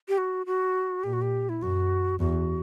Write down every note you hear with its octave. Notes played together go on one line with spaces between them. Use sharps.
G4
F#4
F#4
A#2 G4
F#4
G4
E4
F#2 F#4
E2 F#4